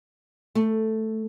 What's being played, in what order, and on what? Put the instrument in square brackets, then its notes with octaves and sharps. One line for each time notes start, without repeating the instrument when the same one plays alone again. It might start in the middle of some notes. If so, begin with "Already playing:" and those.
[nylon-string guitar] A3